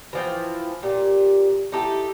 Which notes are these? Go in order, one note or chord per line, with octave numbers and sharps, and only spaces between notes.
E3 F3 G5
A#2 G4
D#4 E4 G4 A4